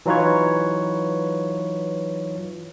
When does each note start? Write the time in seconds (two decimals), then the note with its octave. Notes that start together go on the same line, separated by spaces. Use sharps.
0.06 E3 F#3 D#4 F4 B4 C#5